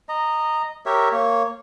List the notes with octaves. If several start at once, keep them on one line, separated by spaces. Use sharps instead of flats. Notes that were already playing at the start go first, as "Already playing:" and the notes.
D#5 A#5
G4 A#4 C#5 E5
A#3 C#5